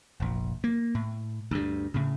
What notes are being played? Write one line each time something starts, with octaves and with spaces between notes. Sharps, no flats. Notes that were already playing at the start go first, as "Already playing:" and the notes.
F1 A#1
A#3
A2
D2 G2
A2 C#3